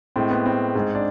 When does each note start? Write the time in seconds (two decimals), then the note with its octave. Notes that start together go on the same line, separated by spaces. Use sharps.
0.16 A2 G#3 C4
0.31 B3
0.46 C4
0.75 G#2 G#3
0.95 D4